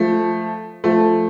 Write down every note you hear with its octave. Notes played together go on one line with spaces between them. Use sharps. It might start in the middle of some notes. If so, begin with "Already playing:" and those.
Already playing: F3 A3
F3 A3